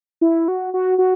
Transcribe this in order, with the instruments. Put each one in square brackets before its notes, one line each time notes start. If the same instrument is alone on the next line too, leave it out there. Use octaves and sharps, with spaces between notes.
[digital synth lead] E4
F#4
F#4
F#4